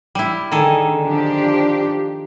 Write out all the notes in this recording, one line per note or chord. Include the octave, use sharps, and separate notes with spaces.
G3 E4
D3 D#3 G#4 A4
F3 D4 G4